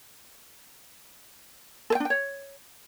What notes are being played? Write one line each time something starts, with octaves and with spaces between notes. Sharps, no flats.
A4
G5
D4
G5
C#5